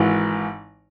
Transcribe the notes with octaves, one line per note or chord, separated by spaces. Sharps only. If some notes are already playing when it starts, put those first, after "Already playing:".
Already playing: G#1 G#2 E3